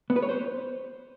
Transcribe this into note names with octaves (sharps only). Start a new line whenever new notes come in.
B3
B4
C#5
C5